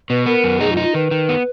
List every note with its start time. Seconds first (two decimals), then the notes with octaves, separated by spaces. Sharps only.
0.09 B2 B4
0.26 B3 A#4
0.44 F#2
0.60 D#4 G#4
0.72 F4
0.77 D#4
0.83 F4
0.94 D#3 B4
1.11 D#3
1.29 B3